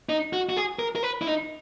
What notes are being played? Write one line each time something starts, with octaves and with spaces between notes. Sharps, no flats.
D#4
F#4
F#4
G#4
A#4
A#4
B4
E4
D#4